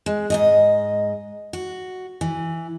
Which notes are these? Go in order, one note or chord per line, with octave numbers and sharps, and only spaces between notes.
G#3
G#2 C#3 D#5
F#4
E3